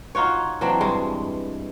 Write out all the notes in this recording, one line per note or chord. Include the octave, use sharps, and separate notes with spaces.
D#4 F4 F#4 C#5
E3 F#3 C4 D4
G2 G#3